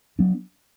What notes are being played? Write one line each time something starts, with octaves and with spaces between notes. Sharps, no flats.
F#3 B3 D4